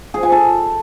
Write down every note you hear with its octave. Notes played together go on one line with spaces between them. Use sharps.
G#4
G#5
A4